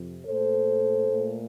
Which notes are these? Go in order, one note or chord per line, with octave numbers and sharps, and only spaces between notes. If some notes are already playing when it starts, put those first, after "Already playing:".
Already playing: F2 C3 F3
A#2 A3 A4 C5
A#2 A3